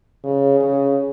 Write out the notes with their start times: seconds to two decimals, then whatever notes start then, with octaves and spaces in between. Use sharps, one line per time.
0.24 C#3
0.60 C#3